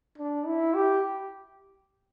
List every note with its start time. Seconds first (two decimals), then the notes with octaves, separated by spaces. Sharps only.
0.18 D4
0.47 E4
0.74 G4